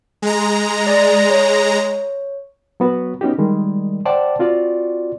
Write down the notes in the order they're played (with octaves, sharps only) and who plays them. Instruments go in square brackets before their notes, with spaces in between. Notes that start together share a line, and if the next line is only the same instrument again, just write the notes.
[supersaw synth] G#3 A#5
[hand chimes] D5 A6 A#6
C#5
[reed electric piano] F#3 B3 F#4
B3 C#4 D#4 F#4 G4
D#3 G3 G#3
C5 D5 F#5 G5 A5 D6
C4 F4 F#4 D5